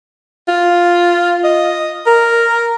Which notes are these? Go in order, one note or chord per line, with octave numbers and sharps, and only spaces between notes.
F4
D#5
A#4